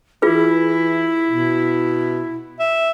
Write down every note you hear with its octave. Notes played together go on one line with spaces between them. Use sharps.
E3 E4 F4 G#4 B4
B2
E5